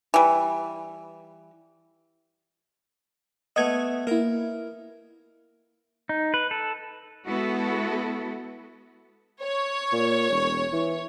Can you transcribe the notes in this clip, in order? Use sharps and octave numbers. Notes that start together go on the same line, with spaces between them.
E3 G3
A3 B3 A4 D#5 G#6
A#3 E4 A#4
D#4
B4
A4
G#3 B3 E4 F#4 A4
C#5
A#2
E1
E3